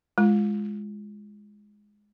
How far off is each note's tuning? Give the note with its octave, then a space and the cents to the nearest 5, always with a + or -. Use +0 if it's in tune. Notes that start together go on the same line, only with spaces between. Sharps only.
G#3 +0 F4 -20